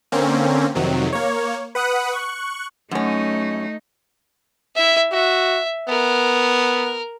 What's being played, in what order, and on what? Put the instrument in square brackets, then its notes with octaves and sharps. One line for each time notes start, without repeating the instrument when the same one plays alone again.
[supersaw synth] D3 A#3 C4 C#4
F2 C3 D#3 F#3
A#3 C#5
B4 F#5 D#6 F#6
C#6 F#6
[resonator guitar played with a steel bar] F#2 C#4 [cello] A3 D#4
[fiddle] E4 E5
[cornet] F#4 [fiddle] E5
[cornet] B3 [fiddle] A#4